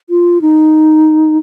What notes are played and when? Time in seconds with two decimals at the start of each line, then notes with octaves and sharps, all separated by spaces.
0.10 F4
0.41 D#4